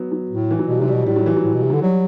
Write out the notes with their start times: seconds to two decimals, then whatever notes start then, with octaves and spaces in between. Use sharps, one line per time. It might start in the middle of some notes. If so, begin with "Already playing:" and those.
Already playing: F#3 B3
0.12 F#3
0.30 A2
0.51 E3
0.59 F#3
0.68 B2 G3
0.80 C3 F#3
0.88 B2 G3
1.06 A2 G3
1.16 F#3
1.26 E3
1.37 F#3
1.44 A2
1.54 B2
1.63 C3
1.70 D3 F#3
1.82 F#3 G3